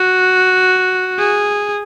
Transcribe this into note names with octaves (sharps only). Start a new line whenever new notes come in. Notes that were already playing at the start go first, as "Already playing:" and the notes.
Already playing: F#4
G#4